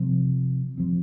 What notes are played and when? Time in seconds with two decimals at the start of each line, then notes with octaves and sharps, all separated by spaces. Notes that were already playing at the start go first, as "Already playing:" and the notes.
Already playing: C3 F3 C4
0.78 F3 C4